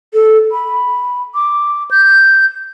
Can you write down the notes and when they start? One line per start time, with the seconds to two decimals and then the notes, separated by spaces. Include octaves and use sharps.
0.14 A4
0.52 B5
1.35 D6
1.91 G6